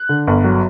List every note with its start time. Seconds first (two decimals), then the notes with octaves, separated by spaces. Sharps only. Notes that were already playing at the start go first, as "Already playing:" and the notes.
Already playing: F#6
0.09 D3
0.27 G1
0.44 F#3